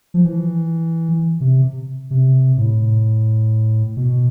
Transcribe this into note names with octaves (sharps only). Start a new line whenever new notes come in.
F3
E3
C3
C3
A2
B2